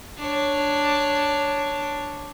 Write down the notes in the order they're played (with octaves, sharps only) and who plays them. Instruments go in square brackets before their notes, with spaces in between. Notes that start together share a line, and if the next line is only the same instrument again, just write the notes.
[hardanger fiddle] D4 C#5